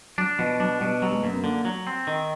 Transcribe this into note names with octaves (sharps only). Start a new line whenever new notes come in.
F#3 D4
B2 F3
F#3 D4
B2 G3
F#3 G3
G#3
F#2 A#3
B3
D3 A#3
F#3
C4
D#3